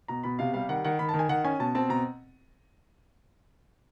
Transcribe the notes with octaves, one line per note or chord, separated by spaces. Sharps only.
B2 A#5
B2 B5
C3 F5
G3 F5
D#3 F#5
D#3 F#5
D#3 B5
A5
D#3
G#5
D#3 F#5
C#4 G#5
B2 A5
C4 A5
B2 A#5